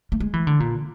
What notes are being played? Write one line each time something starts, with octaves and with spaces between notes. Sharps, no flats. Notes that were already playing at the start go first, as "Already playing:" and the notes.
A3
G#3
E3
D3
A#2